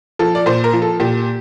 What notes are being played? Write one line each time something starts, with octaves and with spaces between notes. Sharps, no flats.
F3 A4
D5
A#2 C5
A#4
F3
A4
A#2 G4